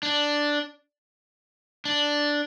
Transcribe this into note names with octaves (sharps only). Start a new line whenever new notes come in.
D4
D4